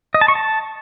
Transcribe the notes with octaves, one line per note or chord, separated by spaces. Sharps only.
D#5
A5
C#6
A5